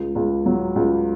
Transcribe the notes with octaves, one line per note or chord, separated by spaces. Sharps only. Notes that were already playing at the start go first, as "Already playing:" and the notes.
Already playing: C#2
C#2
F#3
C#2